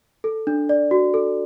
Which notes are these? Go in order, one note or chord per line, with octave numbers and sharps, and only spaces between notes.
A4
D4
D5
F#4
A4